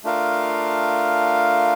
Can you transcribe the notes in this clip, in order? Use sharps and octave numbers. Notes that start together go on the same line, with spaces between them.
A3 D4 F4 A#4 F5